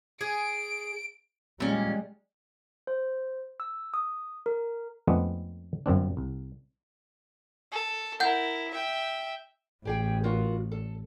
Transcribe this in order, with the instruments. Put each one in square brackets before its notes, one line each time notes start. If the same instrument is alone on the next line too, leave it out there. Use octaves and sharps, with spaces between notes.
[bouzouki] G#4 [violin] D7
[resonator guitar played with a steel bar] A#2 C#4 [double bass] G3 G#3
[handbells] C5
E6
D#6
A#4
[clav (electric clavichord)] F2 G#3 A3 B3 C4 D4
G1 F#2 C4 D4
C2
[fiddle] A4
[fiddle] E4 A#4 [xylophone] F#5 G6
[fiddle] E5 G5
[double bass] A1 [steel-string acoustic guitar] G4 G#4 G5
[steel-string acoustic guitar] F4 F#4 A#4
A4